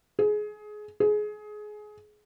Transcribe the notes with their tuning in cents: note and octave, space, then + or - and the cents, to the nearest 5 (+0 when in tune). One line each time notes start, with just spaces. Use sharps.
G#4 +20
G#4 +20